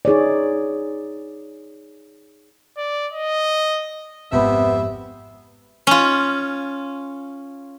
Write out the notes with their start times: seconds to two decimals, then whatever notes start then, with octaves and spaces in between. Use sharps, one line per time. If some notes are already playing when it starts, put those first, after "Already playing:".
0.05 D#4 G#4 C#5 D5
2.77 D5
3.13 D#5
4.32 G#1 F2 C3 B3 E5
5.87 C#4 F4